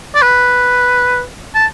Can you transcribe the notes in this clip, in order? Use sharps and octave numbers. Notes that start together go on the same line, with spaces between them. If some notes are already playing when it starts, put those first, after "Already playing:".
D5
B4
A5